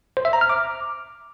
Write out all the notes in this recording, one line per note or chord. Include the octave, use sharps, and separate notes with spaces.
C5
E5
A#5
F6
D6